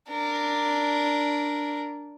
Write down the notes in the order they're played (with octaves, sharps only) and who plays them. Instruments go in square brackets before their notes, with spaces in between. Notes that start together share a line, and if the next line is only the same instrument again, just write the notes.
[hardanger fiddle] D4 A#4